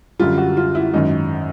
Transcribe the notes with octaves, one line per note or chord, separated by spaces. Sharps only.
F#2 D3 G3 F4
F#4
F4
E4
G#1 F#2 D#3 D#4